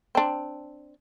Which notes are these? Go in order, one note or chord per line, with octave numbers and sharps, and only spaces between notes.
C4 D4